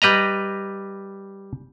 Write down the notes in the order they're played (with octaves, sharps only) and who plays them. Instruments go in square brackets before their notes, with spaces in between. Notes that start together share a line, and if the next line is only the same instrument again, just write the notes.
[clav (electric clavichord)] G3 B4 D#5 A#5